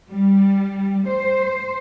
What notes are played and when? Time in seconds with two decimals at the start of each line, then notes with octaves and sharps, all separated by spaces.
0.12 G3
1.05 C5